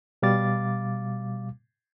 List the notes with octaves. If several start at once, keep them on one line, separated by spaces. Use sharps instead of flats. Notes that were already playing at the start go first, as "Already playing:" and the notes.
B2 G3 F5 D6 A6